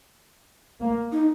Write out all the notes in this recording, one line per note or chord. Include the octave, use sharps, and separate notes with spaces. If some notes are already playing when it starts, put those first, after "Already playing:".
A#3
D#4